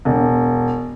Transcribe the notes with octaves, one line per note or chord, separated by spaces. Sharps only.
E1